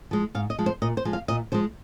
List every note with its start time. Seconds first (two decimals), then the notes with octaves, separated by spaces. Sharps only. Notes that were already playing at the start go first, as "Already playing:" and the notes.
0.11 F3 G#3
0.35 G#2 F5
0.50 D#5
0.58 F3 G#3
0.66 C5
0.82 A#2 D#5
0.97 C5
1.05 F3 G#3
1.13 F5
1.28 A#2 D#5
1.52 F3 G#3 C5